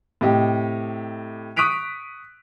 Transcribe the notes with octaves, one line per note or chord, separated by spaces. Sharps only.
A2 C3 G4 D#5
C#6 D#6 F#6 B6 D7 F7